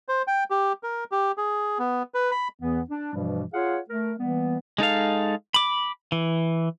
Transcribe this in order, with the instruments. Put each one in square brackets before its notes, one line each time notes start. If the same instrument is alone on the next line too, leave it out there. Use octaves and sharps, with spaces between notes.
[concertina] C5
G5
G4
A#4
G4
G#4
B3
B4
B5
[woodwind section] E2 E3 B3
D4
G2 B2 E3 F3 G3
F4 G#4 C#5 F5 F#5
A3 A#4
E3 G3 A#3 B3
[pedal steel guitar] G#3 D#4 A4 F5
B5 D6
E3